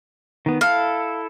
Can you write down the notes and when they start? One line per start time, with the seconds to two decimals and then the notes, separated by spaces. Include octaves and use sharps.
0.46 D#3 B3
0.61 E4 A4 F5